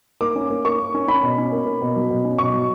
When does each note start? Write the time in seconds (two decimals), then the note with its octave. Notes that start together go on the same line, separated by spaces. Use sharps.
0.21 A#3 D6
0.36 C#4
0.50 A#3
0.65 A#3 C#6
0.79 A#3
0.94 C#4
1.08 C#4 B5
1.23 B2
1.38 C#4
1.52 A#3
1.66 A#3
1.81 B2
1.96 F#3
2.10 B2
2.25 C#4
2.38 B2 C#6
2.53 F#3